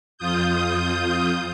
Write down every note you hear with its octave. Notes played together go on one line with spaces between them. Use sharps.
F2 F4 D#6 G6